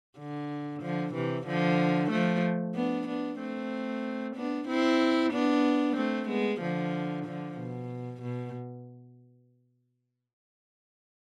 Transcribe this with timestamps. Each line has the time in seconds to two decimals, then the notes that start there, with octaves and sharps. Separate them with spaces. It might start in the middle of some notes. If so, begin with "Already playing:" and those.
0.18 D3
0.82 D3 F3
1.14 C3 E3
1.47 D3 F3
2.11 F3 A3
2.75 B3 D4
3.08 B3 D4
3.39 A3 C4
4.36 B3 D4
4.68 C4 E4
5.33 B3 D4
5.97 A3 C4
6.29 G#3 B3
6.61 D3 F3
7.25 D3 F3
7.59 B2
8.22 B2